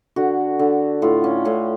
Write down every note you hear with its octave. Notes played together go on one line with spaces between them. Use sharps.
D3 F#4
D3
A2 F4
C#4
A2 C#4